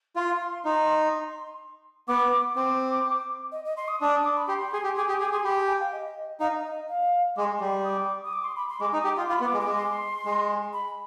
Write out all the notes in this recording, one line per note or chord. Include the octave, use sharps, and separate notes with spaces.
F4 C6
D#4
B3 D6
C4 D6
D#5
D#5
C6
D#6
D4 D#6
D6
B5
G4 C6
G#4
G4
G#4 D6
G4 D#6
G#4 D6
G#4 C6
G4 B5
G#5
G5
F5
D#5
D#4 F5
D#5
F5
G#3 D6
C6
G3
D#6
D6
D#6
D6
C6
B5
C6
G#3 D6
D#4 D#6
G4 D6
F4 C6
F4 B5
B3
D6
G#3
D6
G#3
C6
G#3
B5